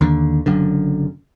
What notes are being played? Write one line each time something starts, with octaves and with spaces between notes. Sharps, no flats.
D#2 D3
F#1 F#2 D3